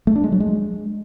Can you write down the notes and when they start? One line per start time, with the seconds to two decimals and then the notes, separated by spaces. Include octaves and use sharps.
0.07 A3
0.15 D4
0.24 G#3
0.32 F#3
0.40 G#3